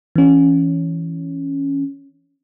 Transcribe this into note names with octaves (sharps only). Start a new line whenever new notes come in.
E3 C#4